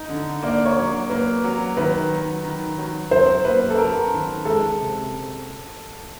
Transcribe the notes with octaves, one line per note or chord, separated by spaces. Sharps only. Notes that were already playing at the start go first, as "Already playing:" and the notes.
Already playing: D#4
D3
A#3 D5
C#5
F#3
A#3 B4
F#3
D#3 B4
F#3
D#3
F#3
F#3 C5
A#3 B4
A4
F#3 A#4
D#3
G#3 A4
C3